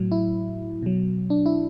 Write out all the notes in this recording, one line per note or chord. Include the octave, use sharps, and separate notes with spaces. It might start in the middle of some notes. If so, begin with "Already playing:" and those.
Already playing: A2 F#3
E4
B2 F#3
D4
E4